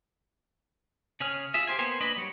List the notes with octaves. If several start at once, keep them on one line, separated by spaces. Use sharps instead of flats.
C#3 G#4 C#5 G#5 F6
F4 G#4 E5
G4 C5 G#5
A#3 B3 C5 G#5
D4 B4 D#5 B5
F#3 G3 C#5